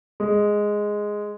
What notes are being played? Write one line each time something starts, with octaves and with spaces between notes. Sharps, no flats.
G#3